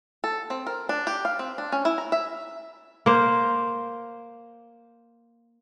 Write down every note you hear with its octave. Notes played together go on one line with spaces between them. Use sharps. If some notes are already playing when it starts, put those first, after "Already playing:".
A4
C4
A#4
D4
G4
F5
C4
D4
C#4
E4
A#5
E5
A#3 C5